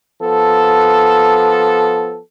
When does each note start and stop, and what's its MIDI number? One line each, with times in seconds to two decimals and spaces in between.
0.22 2.19 53
0.22 2.19 59
0.22 2.19 69